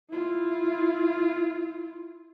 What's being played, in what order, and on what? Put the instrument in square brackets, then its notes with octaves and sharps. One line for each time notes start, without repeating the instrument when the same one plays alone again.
[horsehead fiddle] E4 F4